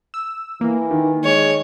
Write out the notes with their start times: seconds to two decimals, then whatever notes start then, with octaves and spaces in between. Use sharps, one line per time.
0.14 E6
0.61 E3 A#3
0.91 D#3
1.24 G#3 C#5